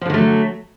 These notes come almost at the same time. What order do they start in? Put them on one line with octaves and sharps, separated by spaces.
F3 D3 D#3 A3 F#3